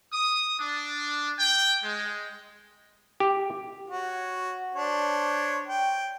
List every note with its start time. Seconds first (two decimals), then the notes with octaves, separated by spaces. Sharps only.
0.11 D#6
0.59 D4
1.38 G5
1.83 G#3
3.20 G4
3.90 F#4 C#5
4.75 D4 C5 C#5
5.68 G5